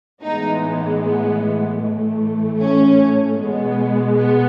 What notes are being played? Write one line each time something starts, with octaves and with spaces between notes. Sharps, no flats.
A2 E3 G#3 B3 D#4
B3
A2 E3 A3
C#4
B2 G#3 B3
B3